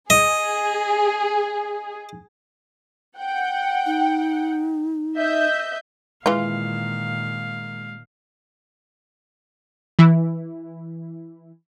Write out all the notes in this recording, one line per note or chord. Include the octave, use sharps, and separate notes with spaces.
G#4 D#5
F#5 G5
D#4
D#5 E5 G6
A#2 D#3 E3 G#3 F4 F5
E3 E4